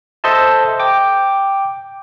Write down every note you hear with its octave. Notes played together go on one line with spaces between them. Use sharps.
A4 C5 D#5 E5 A5
G5 D6